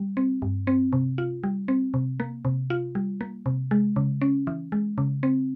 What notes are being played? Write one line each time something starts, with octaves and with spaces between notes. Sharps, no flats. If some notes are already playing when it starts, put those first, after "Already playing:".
Already playing: G3
C4
G2
C4
C3
F4
G3
C4
C3
A#3
C3
F4
G3
A#3
C3
G#3
C#3
C#4
E3
G#3
C#3
C4